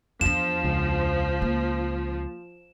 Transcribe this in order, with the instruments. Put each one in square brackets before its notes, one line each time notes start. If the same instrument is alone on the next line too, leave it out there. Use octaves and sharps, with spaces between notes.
[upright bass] E2 D4 [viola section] F3 [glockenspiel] E7
[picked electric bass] C#2
[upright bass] A#3